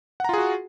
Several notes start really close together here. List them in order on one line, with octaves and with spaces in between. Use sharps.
F#5 A#5 F4 G#4 F#4